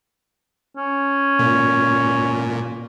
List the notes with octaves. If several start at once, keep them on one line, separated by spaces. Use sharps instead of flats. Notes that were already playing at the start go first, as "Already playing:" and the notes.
C#4
A#2